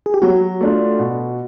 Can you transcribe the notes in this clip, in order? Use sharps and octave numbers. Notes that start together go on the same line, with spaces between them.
G#4
G4
F#3 F#4
A3 D4 F4
B2